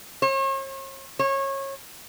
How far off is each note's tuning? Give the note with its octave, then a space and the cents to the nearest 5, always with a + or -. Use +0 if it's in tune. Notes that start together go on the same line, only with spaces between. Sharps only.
C#5 -45
C#5 -25